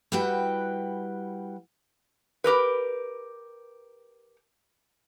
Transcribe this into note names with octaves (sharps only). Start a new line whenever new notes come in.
G3 E4 F#4 B4 F#5 G5
G4 A#4 B4